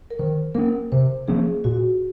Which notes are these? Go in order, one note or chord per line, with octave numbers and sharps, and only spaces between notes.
A#4
D#3 C5
A#3 C#4 A#4
C3 C5
F3 A#3 C#4 G#4
A#2 F#4